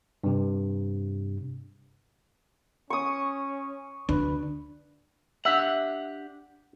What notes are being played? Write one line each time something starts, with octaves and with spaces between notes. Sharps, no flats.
G2 C3
C#4 C#6 D#6
D2 D4 B4
D4 G4 E5 F#5